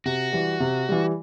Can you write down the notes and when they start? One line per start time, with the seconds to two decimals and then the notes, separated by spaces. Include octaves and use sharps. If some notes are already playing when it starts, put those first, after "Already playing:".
0.05 C3 F#4
0.33 E3 G3
0.60 C3
0.89 E3 G3